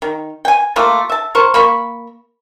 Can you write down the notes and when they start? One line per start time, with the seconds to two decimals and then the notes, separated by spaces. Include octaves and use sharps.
0.02 D#3
0.45 G5 G#5
0.76 G3 A3 A#3 F4
1.10 E5 A5
1.35 A#4 C5 C#6
1.54 A#3 B5 C#6